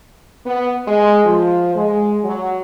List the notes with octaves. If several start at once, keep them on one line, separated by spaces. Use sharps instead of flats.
B3
G#3
F3
G#3
F#3